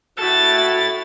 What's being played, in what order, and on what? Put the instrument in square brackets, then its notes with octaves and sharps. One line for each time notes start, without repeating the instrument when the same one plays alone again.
[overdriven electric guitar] E4 A4 [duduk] F#4 [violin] A6